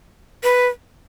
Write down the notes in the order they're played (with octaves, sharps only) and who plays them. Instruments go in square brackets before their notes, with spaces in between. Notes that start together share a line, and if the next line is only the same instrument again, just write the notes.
[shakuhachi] B4